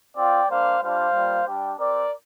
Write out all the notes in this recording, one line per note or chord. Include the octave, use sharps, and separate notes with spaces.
C4 F4 D5 G5
G3 A#3 D4 C5 F5
G3 D4 F4 C5 F5
G3 A#3 F4
G3 D4 G4
C4 G4 A#4 D5